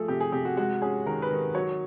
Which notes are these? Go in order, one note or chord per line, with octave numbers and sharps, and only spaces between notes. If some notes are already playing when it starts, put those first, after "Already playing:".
Already playing: F3 A3 G#4 A4
C3 G4
G#4
C3 G4
F#4
G#3 F#4
C#4 G#4
D#3 A#4
B4
D#3
F#3 C#5